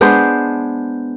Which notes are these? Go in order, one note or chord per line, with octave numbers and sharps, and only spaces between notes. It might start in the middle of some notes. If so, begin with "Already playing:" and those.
G#3 B3 D4 C5